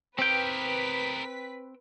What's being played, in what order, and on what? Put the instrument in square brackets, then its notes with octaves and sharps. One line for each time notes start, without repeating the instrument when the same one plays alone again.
[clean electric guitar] C4 G5 [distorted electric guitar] G4 A#4 [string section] B4 B6